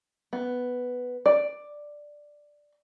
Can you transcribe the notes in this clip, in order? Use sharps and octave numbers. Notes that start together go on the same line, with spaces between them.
B3
D5